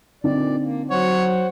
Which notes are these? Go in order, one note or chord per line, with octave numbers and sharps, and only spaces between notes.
A#2 D3 C4 D#4 D5
A#3
F#3 C5 C#5 F#5